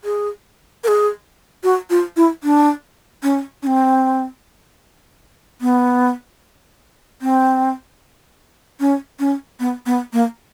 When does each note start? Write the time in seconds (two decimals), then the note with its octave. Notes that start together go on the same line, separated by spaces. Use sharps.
0.04 G#4
0.84 A#4
0.88 G#4
1.64 F#4
1.90 F4
2.17 E4
2.43 D4
3.23 C#4
3.63 C#4
3.67 C4
5.61 B3
7.22 C4
8.80 C#4
9.19 C#4
9.60 B3
9.86 B3
10.13 A#3